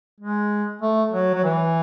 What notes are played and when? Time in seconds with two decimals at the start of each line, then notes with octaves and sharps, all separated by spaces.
0.21 G#3
0.82 A3
1.12 F#3
1.34 F#3
1.44 E3